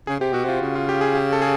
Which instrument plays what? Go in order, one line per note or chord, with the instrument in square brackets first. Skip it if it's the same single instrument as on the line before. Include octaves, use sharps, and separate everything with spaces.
[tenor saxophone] C#3 [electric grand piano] G#4
[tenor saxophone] C3 [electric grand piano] G4
[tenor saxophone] B2 [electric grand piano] F#4
[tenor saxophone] C3 [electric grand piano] F4
[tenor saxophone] C#3
[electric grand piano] F4
G4
G#4
G4
A4
G#4